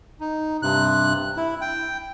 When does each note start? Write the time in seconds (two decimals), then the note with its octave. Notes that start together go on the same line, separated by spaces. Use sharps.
0.20 D#4
0.62 G2 C3 F#6
1.37 E4
1.61 G5